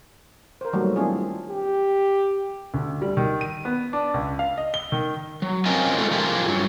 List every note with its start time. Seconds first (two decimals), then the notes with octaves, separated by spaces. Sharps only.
0.61 A#4 C5
0.73 D#3 F#3 G3 A3 A#3
0.96 C4 D4 E4 F4 G#4
1.50 G4
2.74 D2
3.02 G3
3.17 D#3
3.41 D#7
3.65 B3
3.93 D4
4.14 C#2
4.39 F5
4.57 D#5
4.74 G7
4.92 D#3
5.42 F#3
5.66 C4 C#4 F4 A#4 D#5 G#5
5.98 G#3 A3 D#4 F4 A4 D5
6.11 F3 F4 G4 G#4 A#4
6.48 G2 F#3